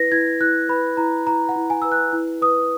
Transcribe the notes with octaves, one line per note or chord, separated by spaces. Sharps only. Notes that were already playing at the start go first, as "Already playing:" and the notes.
Already playing: E4 B4 A#6
E4 G#6
E4 F#6
B4 B5
E4 A#5
E4 A#5
F#5
E4
G#5
B4 E6
F#6
E4
B4 D#6